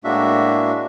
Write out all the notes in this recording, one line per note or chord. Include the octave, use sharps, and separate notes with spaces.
A2 G#3 A#3 D4 F#4 E5